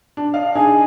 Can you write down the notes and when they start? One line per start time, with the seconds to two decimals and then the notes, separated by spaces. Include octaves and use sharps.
0.17 D4
0.34 D5 D#5 F5
0.55 D4 D#4 G#4 G#5